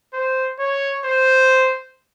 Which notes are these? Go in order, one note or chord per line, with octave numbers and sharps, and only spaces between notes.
C5
C#5
C5